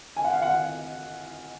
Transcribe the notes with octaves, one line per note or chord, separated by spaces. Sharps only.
G#5
F#5
F5
F#5